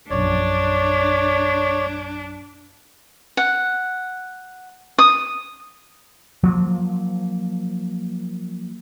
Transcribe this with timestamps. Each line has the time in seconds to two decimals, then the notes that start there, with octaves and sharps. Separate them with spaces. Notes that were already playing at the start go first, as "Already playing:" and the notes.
0.10 A#1 F#2 D4 C#5 D5
3.37 F#5
4.98 D#6
6.43 F3 F#3 A#3